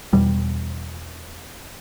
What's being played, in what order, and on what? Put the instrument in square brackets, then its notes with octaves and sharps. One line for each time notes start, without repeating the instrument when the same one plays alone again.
[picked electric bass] E2 B2 G3